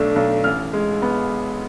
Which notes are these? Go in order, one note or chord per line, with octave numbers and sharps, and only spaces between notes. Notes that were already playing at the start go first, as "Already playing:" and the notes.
Already playing: B1 A3 D4
B1
A1 F6
G#3
B3